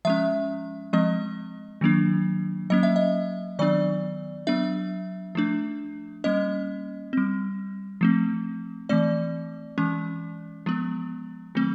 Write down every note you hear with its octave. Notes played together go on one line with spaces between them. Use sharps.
F3 G#3 C#4 E5
F3 G#3 C4 D#5
D#3 F#3 A#3 D4
F#3 A#3 C#4 D#5
E5
D#5
D#3 F#3 B3 D4 D5
F#3 B3 D4 E5
F3 A3 D4
G3 A#3 C#4 D#5
G3 C4
F3 A3 C4
E3 A3 C4 D5
E3 G#3 C#4
F3 G#3 B3
D#3 F#3 A3 C4